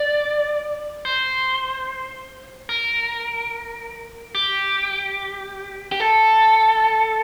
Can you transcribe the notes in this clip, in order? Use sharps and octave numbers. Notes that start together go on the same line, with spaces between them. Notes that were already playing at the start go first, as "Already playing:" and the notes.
Already playing: D5
C5
A#4
G4
G4
A4